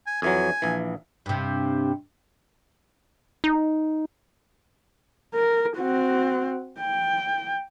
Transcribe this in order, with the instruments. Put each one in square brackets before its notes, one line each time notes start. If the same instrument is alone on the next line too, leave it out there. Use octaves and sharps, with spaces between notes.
[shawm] G#5
[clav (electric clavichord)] F2 E3 F#3 [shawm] G#5
[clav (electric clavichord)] A#1 E3
[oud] G2 C3
[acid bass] D#4
[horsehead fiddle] A#4
C4 F#4
G5